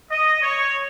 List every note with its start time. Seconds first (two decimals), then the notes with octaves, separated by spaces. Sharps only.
0.11 D#5
0.42 C#5